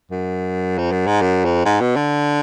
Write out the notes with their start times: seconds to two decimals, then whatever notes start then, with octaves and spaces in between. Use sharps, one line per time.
0.11 F#2
0.78 F2
0.91 F#2
1.07 G#2
1.21 F#2
1.45 F2
1.66 G#2
1.81 B2
1.96 D3